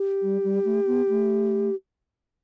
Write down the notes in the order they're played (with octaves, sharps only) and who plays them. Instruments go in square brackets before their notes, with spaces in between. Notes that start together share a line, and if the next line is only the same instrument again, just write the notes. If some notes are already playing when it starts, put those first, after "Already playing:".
Already playing: [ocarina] G4
[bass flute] G3
G3
A3
B3
A3